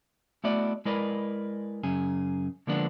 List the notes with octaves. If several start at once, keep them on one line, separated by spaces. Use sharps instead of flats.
A3 B3 E4 F#4 D5 D#5
G#3 E4 A#4 B4 D5 D#5
F#2 C#3 G#4
D3 F3 G#3 A#3 B3 D4